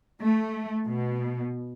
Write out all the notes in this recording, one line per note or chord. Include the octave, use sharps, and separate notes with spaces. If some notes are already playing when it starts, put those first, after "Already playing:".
A3
B2